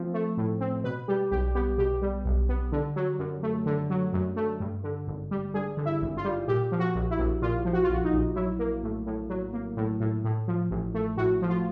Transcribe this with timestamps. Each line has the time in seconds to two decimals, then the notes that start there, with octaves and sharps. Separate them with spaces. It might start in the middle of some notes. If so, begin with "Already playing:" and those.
Already playing: F3 A3 C4
0.14 A3
0.37 A2
0.60 C4
0.84 B2 B4
1.08 G3 G4
1.31 B1 G4
1.55 B3 G4
1.78 B2 G4
2.02 G3
2.25 B1
2.49 B3
2.72 D3
2.96 F#3
3.19 F#2
3.43 A3
3.66 D3
3.90 F#3
4.13 F#2
4.36 A3
4.60 G2
4.84 D3
5.07 G#1
5.31 G3
5.54 G2 G#4
5.77 D3
5.86 E4
6.01 G#1
6.17 F4
6.25 G3
6.48 A#2 G4
6.72 F3
6.79 F#4
6.95 A#1
7.11 E4
7.19 A#1
7.42 A#2 F4
7.65 F3
7.73 F#4
7.83 F4
7.89 A#1 F#4
8.04 D#4
8.13 A#1
8.36 F#3 E4
8.59 A#3
8.83 A2
9.06 A2
9.30 F#3
9.53 A#3
9.77 A2
10.00 A2
10.24 A2
10.48 F3
10.70 A1
10.94 A3
11.17 A2 F#4
11.42 F3
11.49 F4